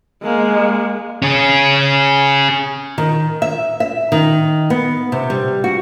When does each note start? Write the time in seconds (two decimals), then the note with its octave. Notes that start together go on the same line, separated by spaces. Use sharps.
0.23 G#3 A#3
1.22 C#4 G#4
2.98 D#3
3.42 E5
3.80 E5
4.12 D#3
4.70 B3
5.12 C3
5.30 G3
5.64 F#4